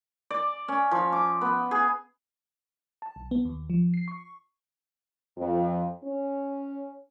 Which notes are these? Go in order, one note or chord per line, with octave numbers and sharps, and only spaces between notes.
D5
C#4
F3
D6
B3
G#4
A5
B1
B3
D#2
F3
C7
C#6
F2
C#4